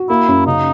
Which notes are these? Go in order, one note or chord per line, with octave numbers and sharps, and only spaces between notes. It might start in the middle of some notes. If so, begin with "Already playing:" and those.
Already playing: F#4
A#3 E4
F#2
C#3 D#4